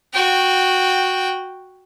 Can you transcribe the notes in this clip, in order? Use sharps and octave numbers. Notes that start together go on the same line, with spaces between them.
F#4 G5